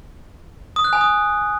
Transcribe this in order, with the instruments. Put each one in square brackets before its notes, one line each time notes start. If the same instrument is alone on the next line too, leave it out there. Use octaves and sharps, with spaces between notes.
[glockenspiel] D#6
F#6
G#5
D#6